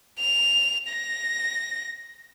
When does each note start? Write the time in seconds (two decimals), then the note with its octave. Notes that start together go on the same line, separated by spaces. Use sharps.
0.19 F7
0.89 A#6